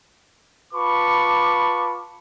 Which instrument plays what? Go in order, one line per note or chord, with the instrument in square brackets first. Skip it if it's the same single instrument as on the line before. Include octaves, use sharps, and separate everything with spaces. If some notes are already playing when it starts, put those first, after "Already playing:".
[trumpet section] F4 B4 A5 B5 C#6 D6